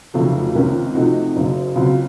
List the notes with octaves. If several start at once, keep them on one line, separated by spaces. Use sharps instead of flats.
F1 F2 C#3 F#3 A3
C#2 C3 D#3 A#3 C#4
C3 F3 A3 D#4 F#4
F#1 F#2 C#3
C#2 C#3 F#3 C4 F#4